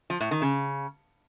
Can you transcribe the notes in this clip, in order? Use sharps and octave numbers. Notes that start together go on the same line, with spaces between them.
F3
A2
D#3
C#3